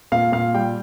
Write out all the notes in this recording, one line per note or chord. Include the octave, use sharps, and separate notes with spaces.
A#2 F5
A#2 F5
G3 G5